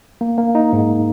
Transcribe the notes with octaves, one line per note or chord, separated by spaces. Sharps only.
A#3
A#3
D#4
G#2